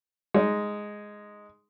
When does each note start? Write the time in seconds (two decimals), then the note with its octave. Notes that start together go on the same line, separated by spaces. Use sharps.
0.34 G#3 D#4